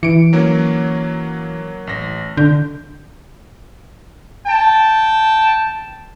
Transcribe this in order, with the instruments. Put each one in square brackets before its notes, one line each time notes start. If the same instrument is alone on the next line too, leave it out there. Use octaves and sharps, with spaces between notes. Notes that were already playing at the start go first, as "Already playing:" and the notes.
[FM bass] E3 [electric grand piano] C#7 D7
[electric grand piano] F#3 A#3 C#4
A1 A#6
[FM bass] D3 [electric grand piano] G6
[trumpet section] G5 A5